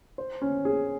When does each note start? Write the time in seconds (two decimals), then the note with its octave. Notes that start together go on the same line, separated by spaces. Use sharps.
0.18 C5
0.42 C#4
0.65 G#4